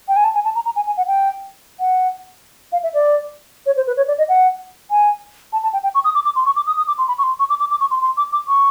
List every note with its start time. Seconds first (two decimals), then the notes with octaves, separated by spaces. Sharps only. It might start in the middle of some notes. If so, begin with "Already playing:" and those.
0.08 G5
0.16 G#5
0.24 A5
0.35 G#5
0.45 A5
0.55 A#5
0.65 A#5
0.76 G#5
0.86 G#5
0.97 F#5
1.07 G5
1.80 F#5
2.72 F5
2.83 E5
2.94 D5
3.66 C#5
3.76 C5
3.87 B4
3.97 C#5
4.08 D5
4.18 D#5
4.29 F#5
4.91 G#5
5.53 A5
5.63 A5
5.73 G5
5.84 G5
5.95 C#6
6.04 D#6
6.15 D6
6.25 D6
6.36 C6
6.46 C#6
6.56 D6
6.67 D#6
6.77 D#6
6.87 D6
6.98 C6
7.08 B5
7.18 C#6
7.23 C6
7.39 C#6
7.49 D6
7.60 D6
7.71 D6
7.81 C#6
7.91 C6
8.01 C6
8.17 D6
8.33 D6
8.48 C#6